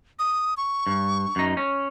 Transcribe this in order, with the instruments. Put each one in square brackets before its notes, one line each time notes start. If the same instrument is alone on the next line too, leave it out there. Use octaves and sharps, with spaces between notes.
[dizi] D#6
C#6
[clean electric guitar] G2
F#2 D#4
C#4